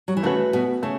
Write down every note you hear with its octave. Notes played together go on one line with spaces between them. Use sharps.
F#3
E3
C#3 A3 F#4 B4
B2
C#3 A3